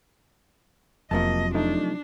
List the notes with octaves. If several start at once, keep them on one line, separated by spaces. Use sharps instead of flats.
F1 F#2 C3 F3 A#3 D#5 A5
A3 D4 D#4